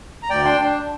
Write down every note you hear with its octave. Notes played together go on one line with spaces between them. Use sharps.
A#5
D2 D5 G5
D4 G5 C6
D4